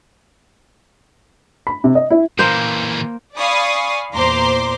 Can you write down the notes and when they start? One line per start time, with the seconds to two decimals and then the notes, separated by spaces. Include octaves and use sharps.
1.67 B5
1.84 C3
1.95 D#5
2.10 E4
2.39 A#2 E3 A#3 C5
3.38 D5 F5 G#5 B5 C#6 D#6
4.14 E2 A#2 C5 A#5 C6 D6